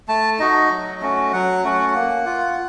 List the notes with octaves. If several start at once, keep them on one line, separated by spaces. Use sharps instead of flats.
A3 A5
D#4 F#4 D#5
F#3
A3 C#4 F#4
F#3 F#5
A3 C#4 F#4
A#3
F4